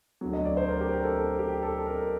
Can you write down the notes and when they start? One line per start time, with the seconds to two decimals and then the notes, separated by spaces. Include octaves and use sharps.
0.21 D2 D3 F#3
0.33 D#5
0.45 D5
0.57 C5
0.68 A#4
0.80 G4
0.92 A#4
1.04 A4
1.39 G4
1.63 A4
1.86 A#4